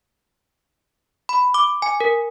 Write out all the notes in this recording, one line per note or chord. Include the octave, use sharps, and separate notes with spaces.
B5
D6
G#5
A#4